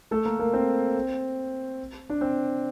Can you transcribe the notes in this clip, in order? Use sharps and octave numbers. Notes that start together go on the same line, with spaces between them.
A3 A4
A#3 A#4
A#3 A#4
C4 C5
D4
C4